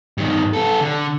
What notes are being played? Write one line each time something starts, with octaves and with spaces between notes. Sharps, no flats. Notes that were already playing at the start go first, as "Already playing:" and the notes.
G2 D#3
B3 A4
D3